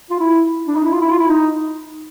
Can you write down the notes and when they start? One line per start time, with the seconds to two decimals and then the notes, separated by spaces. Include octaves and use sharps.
0.10 F4
0.19 E4
0.68 D4
0.76 D#4
0.84 E4
0.92 F4
1.01 E4
1.10 F4
1.19 E4
1.28 D#4